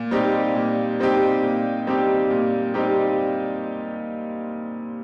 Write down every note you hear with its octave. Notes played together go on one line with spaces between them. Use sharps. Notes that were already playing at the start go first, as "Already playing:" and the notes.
Already playing: A#2
G3 C4 D#4 G4
A#2
G3 C4 D#4 G4
A#2
G3 C4 D#4 G4
A#2
G3 C4 D#4 G4